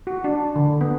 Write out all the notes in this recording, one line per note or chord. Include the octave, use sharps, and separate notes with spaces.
F#4
D4
D3
B3